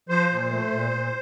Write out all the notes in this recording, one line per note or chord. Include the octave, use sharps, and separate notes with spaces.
F3 C5
A#2
A3
A#2
A#2